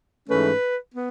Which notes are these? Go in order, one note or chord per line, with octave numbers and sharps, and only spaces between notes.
G#2 E3 A3 C#4 B4
B3